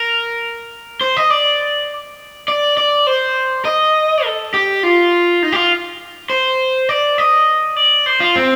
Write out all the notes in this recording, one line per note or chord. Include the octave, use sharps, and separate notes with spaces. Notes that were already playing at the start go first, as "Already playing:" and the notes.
Already playing: A#4
C5
D#5
D5
D5
D5
C5
D#5
A4
G4
F4
D#4
G4
F4
C5
D5
D#5
D5
C5
F4
C4